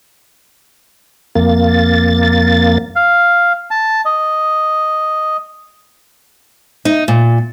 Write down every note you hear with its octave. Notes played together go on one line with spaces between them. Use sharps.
F2 A#3 A6
F5
A5
D#5
D#4
A#2